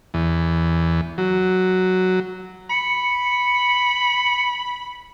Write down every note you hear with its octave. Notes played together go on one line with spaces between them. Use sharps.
E2
F#3
B5 C#7